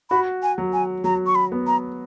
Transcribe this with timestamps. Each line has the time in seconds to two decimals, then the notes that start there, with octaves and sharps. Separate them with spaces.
0.10 F#4 B5
0.43 G#5
0.58 F#3
0.73 G#5
1.04 F#3 A#5
1.26 C#6
1.35 B5
1.52 B3
1.67 A#5